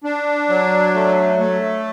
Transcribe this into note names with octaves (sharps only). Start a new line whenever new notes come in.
D4
F#3
A3
A3